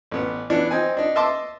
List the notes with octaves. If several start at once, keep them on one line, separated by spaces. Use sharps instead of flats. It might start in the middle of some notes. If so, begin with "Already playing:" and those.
A1 B3
E3 B3 D4
C4 D#4 G#5
D4 D#4
D#5 E5 A5 C6 D6